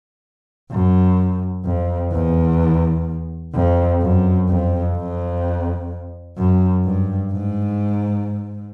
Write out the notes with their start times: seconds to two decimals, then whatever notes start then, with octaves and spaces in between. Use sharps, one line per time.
0.72 F#2
1.65 F2
2.13 E2
3.54 F2
4.02 F#2
4.49 F2
4.96 F2
6.38 F#2
6.85 G2
7.32 G#2